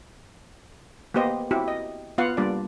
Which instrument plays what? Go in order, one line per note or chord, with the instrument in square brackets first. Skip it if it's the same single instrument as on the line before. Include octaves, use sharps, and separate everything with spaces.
[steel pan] A#3 B3 G4 C5 D#5
C4 E4 F#4 G4
D#5
B3 F4 F5 F#5
G3 A#3 D4 F4 D5